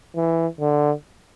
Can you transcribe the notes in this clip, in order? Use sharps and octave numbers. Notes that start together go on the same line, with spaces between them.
E3
D3